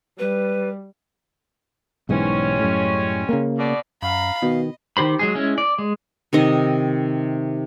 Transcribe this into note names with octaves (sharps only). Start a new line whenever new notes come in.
G3 B4
B1 G#2 E3 G3 G#3 C#4
F#2 A2
C#3 A#3
B2 D5
F#2 F5 A#5 B5
B2 D#3 D#5
D#3 G4 C5 B5
F#3 G#3 G#4
G#3 C#4 E4
D5
G#3
C3 D#3 D#5